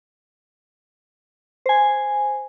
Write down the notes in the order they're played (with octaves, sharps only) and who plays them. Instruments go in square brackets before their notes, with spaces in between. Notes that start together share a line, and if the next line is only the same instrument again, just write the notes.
[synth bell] C5 G#5